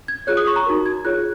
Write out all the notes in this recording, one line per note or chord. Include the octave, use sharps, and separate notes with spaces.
G#6
F4 G#4 C#5 F#6
D#6
C#6
A#5
D#4 F#4 A#4
G#6
F4 G#4 C#5 F#6